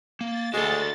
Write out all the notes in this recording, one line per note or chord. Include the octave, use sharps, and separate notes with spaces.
A#3 A6
D2 G#3 F#4 A4